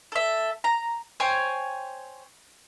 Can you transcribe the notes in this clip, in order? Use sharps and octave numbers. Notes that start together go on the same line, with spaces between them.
A4 E5
A#5
C5 C#5 G5 G#5